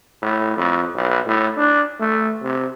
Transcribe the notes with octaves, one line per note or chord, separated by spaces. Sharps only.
A2
F2
B1
A2
D4
A3
C3